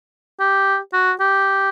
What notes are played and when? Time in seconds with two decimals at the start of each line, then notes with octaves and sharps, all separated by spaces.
0.40 G4
0.93 F#4
1.20 G4